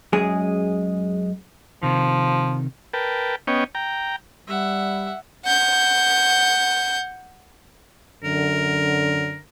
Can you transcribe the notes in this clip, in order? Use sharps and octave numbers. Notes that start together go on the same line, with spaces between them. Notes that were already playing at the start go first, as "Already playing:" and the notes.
F#2 G#3 G#4
C3 D#3 F3
A#4 B4 G5 A5
B3 C#4 C#5 D#5 G5
G5 A#5
G3 E5 F#5
F#5 G6
F#2 D3 A#4